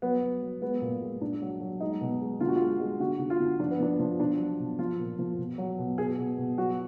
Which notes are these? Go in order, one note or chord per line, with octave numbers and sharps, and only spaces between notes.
F#3 B3
F#3
F#3
G#3 B3
A#2
G#3
A#2 D4
F#3
F#3
G#3 D#4
B2
G#3
D3 F4
F#4
G#3 F4
G#3
D3 F#4
D3
F4
D3
F3 D4
B3
F3 D4
F3
B2 D4
F#3
B2
F3 F4
A#2
F3
B2
F#3
B2
B2 G#4
B2
B2
F#3 F#4